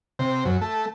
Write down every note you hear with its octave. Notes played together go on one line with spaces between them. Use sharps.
C3
F#2
A3